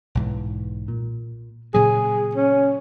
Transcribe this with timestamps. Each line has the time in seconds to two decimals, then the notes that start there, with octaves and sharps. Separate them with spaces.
0.15 B1 G#2 E3
0.88 A#2
1.74 A#2 C#3 F#3 G#4
2.35 C#4